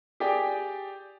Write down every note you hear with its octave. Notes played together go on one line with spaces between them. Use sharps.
G4 G#4 D5 G5